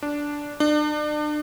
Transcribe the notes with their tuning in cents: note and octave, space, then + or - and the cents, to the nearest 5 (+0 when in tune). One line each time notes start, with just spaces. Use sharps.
D4 -5
D4 +35